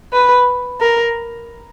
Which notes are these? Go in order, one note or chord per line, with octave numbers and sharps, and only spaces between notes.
B4
A#4